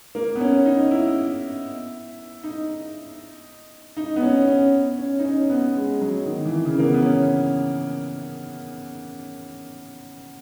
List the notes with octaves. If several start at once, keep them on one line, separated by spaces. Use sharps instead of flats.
A#3
B3
C#4
D#4
E4
D#4
D#4
B3
C#4
C#4
C#4
D#4
C#4
B3
G#3
F#3
D#3
E3
C#3
A#3
B3
B3
C#4